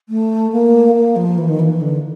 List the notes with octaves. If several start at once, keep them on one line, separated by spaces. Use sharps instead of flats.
A3
A#3
A#3
F3
E3
D#3
E3
D3